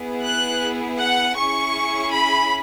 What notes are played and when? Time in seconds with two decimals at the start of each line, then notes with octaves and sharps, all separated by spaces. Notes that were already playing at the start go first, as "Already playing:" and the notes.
Already playing: B3 E4 G#4
0.22 F#6
0.98 F#5
1.36 C#4 E4 G#4 C#6
2.12 B5